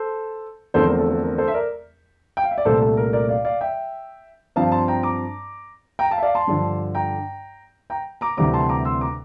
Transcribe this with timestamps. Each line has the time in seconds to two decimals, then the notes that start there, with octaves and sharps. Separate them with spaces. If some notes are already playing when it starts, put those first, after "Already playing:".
Already playing: A4 C5
0.74 E2 D3 F3 A3 C4 A4 C5
0.86 A#4
0.98 A4
1.10 A4
1.22 A#4
1.38 A4 C5
1.48 E5
1.54 A#4 D5
2.37 G5
2.44 F5
2.51 E5
2.58 D5
2.65 C2 A#2 A3 A4 C5
2.81 A4
2.97 A#4
3.13 A#4 D5
3.29 D5 F5
3.45 D5 F5
3.61 E5 G5
4.56 G2 F3 C4 F5 A5
4.72 A5 C6
4.88 G5 A#5
5.03 A#5 D6
5.99 G5 A#5
6.11 F5 A5
6.18 E5
6.23 D5 F5
6.35 A5 C6
6.47 G2 D3 F3
6.94 G5 A#5
7.90 G5 A#5
8.21 A#5 D6
8.37 D2 C3 E3 G3 C4 A#5 D6
8.53 A5 C6
8.69 A#5 D6
8.85 C6 E6
9.01 A#5 D6